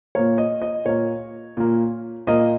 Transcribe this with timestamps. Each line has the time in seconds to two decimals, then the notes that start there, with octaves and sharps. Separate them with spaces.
0.15 A#2 A#3 C#5
0.38 D#5
0.62 D#5
0.85 A#2 A#3 C#5
1.57 A#2 A#3
2.27 A#2 A#3 D#5